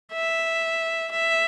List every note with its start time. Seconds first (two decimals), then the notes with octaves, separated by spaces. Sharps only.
0.13 E5
1.12 E5